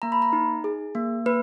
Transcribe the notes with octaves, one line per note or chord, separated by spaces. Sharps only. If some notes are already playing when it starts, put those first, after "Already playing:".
A#3 A#5
B5
A#5
D#4
G#4
A#3
A#3 B4